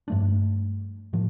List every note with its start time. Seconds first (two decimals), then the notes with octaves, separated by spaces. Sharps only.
0.08 G2 F3 A3 D4
1.13 A2 F3